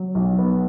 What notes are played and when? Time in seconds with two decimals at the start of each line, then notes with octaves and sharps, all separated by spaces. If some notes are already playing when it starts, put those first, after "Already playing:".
Already playing: F#3
0.15 B1
0.39 B3